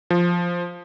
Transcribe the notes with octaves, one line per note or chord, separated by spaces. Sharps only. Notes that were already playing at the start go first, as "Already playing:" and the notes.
F3